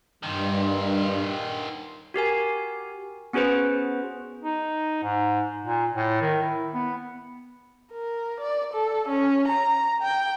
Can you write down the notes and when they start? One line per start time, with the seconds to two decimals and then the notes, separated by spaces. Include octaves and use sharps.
0.23 G2 A#2 D#3
2.14 F#4 G4 A#4 G#5
3.33 B3 C#4 F#4 G#4 B4 C5
4.43 D#4
5.03 G#2
5.65 A#2
5.95 A2
6.21 D#3
6.42 E4
6.74 B3
7.93 A#4
8.40 D5
8.73 A4
9.08 C#4
9.48 A#5
10.02 G5